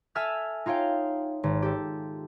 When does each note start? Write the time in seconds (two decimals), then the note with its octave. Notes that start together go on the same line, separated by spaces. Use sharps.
0.15 A4 E5 G#5 E6 F6 G#6
0.66 D#4 F4 C#5 F5 G5
1.43 G#1
1.62 G4 A4